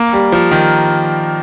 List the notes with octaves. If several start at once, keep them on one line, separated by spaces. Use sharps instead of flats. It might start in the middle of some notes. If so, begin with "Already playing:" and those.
Already playing: A#3
G3
F3
D#3